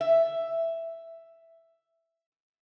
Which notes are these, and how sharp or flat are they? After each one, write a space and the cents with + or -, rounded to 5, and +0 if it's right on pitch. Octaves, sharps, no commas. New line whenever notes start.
E5 +5